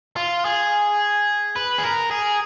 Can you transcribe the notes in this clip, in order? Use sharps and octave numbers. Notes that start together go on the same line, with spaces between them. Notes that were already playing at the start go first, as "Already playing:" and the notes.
F4
G#4
B4
G#4
A#4
G#4